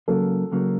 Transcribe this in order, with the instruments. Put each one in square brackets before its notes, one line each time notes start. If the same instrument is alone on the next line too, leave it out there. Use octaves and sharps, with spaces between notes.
[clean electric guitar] C#2 C#3 F#3 A#3 [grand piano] A4
[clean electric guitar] C#2 C#3 F#3 A#3